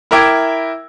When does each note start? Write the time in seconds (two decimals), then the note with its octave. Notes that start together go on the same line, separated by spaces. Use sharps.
0.11 E4 A#4 E5 G5 D6 G#6